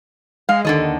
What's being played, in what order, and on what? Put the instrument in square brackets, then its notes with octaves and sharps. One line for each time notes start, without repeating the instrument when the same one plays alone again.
[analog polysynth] G#3 [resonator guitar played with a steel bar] F5
[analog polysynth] D#2 [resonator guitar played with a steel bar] D3 A4 D#5